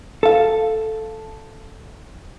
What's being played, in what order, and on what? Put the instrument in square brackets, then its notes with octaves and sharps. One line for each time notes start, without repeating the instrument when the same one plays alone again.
[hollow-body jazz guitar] A4 F5